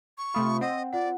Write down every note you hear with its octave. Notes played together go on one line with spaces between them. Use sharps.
C#6
C3 A3 F4 B5 D#6
C4 D#5 F#5
F4 D5 F#5